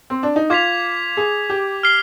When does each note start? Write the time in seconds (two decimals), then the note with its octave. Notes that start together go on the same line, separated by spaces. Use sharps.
0.10 C4
0.23 D4
0.36 D#4
0.50 F4 D6 G#6 B6 F7
1.17 G#4
1.50 G4
1.83 F6 C7 G7